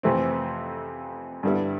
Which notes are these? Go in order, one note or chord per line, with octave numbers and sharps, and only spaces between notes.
F2 C3 E3 A3 C4
G2 D3 G3 B3 E4